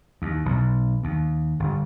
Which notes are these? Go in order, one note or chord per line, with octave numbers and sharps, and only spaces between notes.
D#2
B1
D#2
G1